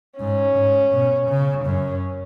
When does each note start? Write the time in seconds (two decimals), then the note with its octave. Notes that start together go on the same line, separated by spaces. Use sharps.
0.19 G#2 C#4
0.57 G#2
0.92 B2
1.29 C#3
1.65 F#2 C#4